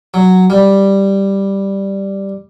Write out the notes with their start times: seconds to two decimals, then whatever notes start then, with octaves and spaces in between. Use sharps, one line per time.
0.14 F#3
0.50 G3